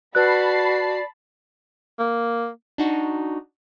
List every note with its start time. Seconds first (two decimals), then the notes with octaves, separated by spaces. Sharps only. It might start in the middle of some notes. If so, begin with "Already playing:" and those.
0.15 F#4 B4 D5 A5 B5 F#6 C7
1.99 A#3
2.78 D4 D#4 F#4